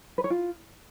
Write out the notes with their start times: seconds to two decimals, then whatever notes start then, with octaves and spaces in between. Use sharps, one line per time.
0.18 B4
0.24 C#5
0.30 F4